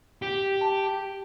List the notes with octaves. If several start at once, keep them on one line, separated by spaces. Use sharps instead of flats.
G4
A5